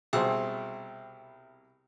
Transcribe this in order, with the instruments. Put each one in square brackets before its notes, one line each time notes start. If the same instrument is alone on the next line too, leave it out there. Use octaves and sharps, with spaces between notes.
[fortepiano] C2 B2 [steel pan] G#4 C5 [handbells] E5 G5 E6